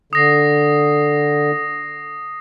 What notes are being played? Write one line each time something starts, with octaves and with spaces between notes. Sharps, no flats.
D3 D#6 A#6 C7